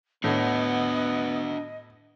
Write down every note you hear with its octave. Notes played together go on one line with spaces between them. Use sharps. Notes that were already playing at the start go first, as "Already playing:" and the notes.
A2 B3 D4 F#4 D#5 F#5